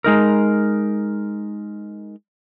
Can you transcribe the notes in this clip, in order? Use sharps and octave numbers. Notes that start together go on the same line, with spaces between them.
G#3 D#4 A#4